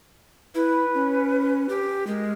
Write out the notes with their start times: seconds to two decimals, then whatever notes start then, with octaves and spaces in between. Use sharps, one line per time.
0.55 E4 B4
0.94 C#4
1.69 G4
2.07 G#3 A#4